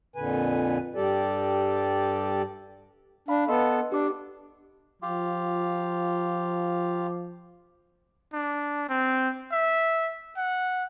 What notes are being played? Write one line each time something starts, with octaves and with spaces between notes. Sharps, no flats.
F2 A#2 D3 B4 G#5
G2 G3 G4 A4 D5
D4 F5 B5
B3 A4 D#5 C6
D4 G4 D6
F3 F4 G4
D4
C4
E5
F#5